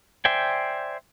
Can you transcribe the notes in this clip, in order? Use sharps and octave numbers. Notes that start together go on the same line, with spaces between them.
C5 D5 E5 G5 G#5